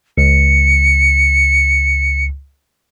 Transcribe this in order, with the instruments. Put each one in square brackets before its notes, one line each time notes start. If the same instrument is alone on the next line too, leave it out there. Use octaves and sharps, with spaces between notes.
[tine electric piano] C#2 [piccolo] C#7